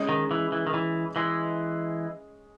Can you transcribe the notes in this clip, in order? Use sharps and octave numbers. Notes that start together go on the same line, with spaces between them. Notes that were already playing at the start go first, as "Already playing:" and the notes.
Already playing: G#3 C#4 G#4 D#5
D#3
E3
E3
D#3
E3
E3 G#3